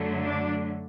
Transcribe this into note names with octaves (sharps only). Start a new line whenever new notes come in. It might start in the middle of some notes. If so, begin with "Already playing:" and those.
Already playing: F#2 D3 F#3 A3
D4